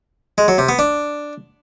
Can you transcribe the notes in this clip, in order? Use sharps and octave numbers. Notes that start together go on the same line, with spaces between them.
G#3
F#3
C3
B3
D4